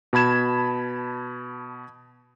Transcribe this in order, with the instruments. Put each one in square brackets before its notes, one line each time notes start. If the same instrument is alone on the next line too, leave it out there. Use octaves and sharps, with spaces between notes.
[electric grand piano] B2 A5 B5 G#6 E7